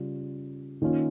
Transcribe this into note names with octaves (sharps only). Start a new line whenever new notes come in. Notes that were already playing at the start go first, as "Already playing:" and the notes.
Already playing: C#3 G3 C#4 F4
D#3 A#3 C#4 F4